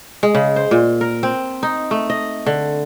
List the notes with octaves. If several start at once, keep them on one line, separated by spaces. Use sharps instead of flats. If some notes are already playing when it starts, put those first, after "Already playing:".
G#3
C#3
C5
A#2
A#4
C4
D#4
A3
D#5
D3